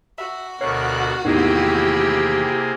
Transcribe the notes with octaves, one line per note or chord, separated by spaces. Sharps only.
F#4 E5
D2 B2 A#4 C#5 F5 F#6
E2 A2 C3 D#3 A#3 E4 G4 G#4